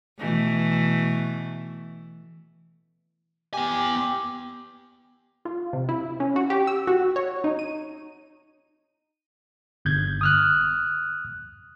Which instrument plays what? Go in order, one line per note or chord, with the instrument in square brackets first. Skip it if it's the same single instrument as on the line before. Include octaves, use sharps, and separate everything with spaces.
[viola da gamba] B2 E3 A3
[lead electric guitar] B3 G#5 [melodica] G4
[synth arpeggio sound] F4
C3
E4
C#4
F#4
G4
E6
F#4
C#5
D#4
D#7
[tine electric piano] G1 G6 G#6
D#6 F6 F#6